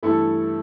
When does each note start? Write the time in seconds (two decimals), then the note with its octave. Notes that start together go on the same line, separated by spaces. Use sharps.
0.03 G2 E3 A3 E4 A4